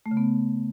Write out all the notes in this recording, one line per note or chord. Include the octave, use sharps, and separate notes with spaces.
A3
C#3
B3